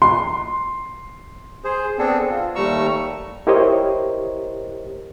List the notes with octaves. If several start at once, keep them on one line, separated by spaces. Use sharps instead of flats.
C6
G#4 C5
B3 C4 D4 G#4 A4
F4
D#2 G3 A3 A#5 C#6 E6
E4 G4 A#4 C5 C#5 D#5